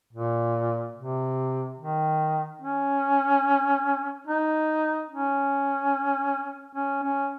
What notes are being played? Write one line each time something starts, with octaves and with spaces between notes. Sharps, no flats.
A#2
C3
D#3
C#4
D#4
C#4
C#4
C#4